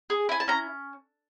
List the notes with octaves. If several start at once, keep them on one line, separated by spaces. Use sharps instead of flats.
G#4
E4 G#5
A5
C#4 A#5